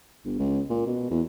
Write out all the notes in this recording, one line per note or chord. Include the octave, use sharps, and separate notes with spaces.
G1
C#2
A#2
B2
E2